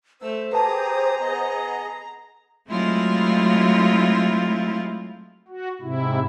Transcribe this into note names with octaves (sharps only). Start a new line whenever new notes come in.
A3 C5 E6
G4 G#4 B4 A5 A#5 D#6
B3 G#4 D#5
F#3 G#3 A3 C4 E4 F4
F#4
G#2 C3 E4